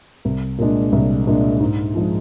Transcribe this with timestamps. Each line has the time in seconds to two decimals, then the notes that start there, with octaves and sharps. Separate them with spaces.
0.25 C2
0.58 A#2 G#3 D4
0.92 C2
1.26 A#2 G#3 D4
1.60 G#2
1.95 F3 G#3 D#4